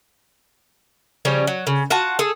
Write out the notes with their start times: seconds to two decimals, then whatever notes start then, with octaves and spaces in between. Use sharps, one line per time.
1.25 C#3 F3 G3 C#4
1.47 F#3
1.67 C#3
1.90 F4 F#4 F#5 A5
2.19 G#4 A4